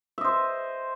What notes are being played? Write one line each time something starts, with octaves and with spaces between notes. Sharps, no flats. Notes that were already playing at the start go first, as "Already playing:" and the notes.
C5 D#5 E5